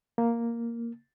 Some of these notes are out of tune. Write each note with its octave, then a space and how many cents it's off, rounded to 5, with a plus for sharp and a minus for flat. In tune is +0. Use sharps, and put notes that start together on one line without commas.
A#3 +0